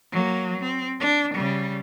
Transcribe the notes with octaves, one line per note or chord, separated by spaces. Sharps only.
F#3 A#3
C4
D4
C#3 G3